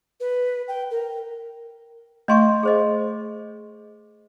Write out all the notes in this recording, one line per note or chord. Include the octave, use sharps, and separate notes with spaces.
B4
G5
A#4
A3 D#5 F5 C6 C#6
G#4 C5 D#5